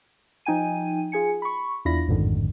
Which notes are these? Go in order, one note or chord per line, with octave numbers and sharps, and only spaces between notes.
F3 D#4 G5 G#5 D#7
F4 G#4 G#5 C#7
B5 C#6
E2 D4 E4 F4 B5 A#6
A1 F2 G#2 D3 D#3